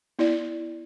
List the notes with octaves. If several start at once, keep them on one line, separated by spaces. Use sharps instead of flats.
B3 E4 D5